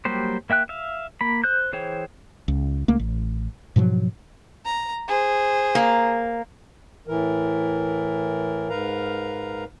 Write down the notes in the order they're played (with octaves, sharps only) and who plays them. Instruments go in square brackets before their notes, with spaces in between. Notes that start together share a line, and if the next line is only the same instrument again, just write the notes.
[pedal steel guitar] F#3 G3 A#3 G4 C5
A#3 E5 G5 F#6
E5 F5
A#3 B5
C5 F#6 G6
E3 G#4 C5 C#5 G5
[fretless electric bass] C#2
C#2 A3 A#3
A1
G#2 B2 F3 F#3
[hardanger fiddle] A#5
G#4 C5
[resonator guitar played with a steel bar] A#3
[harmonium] A2 E3 A#4
G#2 A#4 B4 F5 A#5